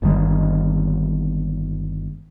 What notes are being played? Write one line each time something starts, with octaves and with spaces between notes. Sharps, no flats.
G1 G2 D#3 G#3